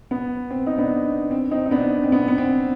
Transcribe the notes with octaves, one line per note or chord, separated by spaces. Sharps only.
B3
C4
D#4
B3 D4
C4
C4 D#4
D#4
B3 D4
C4
B3
B3
C4